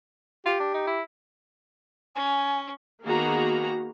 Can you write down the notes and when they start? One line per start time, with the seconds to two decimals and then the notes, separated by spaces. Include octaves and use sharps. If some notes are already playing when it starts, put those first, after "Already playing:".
0.46 F4 G4
0.60 D4
0.74 D#4
0.87 E4
2.16 C#4 G#5
3.06 D#3 A#3 B3 F#4 G#4 A#5